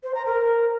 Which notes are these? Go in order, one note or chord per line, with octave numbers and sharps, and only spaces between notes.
C5
A#5
A#4